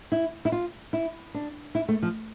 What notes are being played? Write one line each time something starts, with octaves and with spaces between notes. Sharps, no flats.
E4
E4
F4
E4
D4
E4
A3
F3